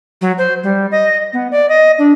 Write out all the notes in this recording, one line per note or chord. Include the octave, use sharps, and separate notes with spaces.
F#3
C5
G3
D#5
B3
D5
D#5
D4